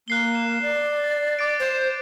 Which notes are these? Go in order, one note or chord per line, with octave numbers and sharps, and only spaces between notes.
A#3 F#6 C7 G7
E7
D5
A6
D6 A6 D7
C5